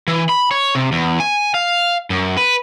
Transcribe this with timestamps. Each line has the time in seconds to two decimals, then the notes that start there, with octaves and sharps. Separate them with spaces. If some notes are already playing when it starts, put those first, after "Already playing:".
0.08 E3
0.29 B5
0.51 C#5
0.75 C3
0.92 E2
1.20 G#5
1.54 F5
2.10 F#2
2.37 B4